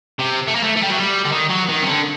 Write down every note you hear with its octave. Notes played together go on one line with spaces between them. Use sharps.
C3
A3
A#3
A3
A3
G3
F#3
G3
D3
D#3
F#3
D#3
C3
D3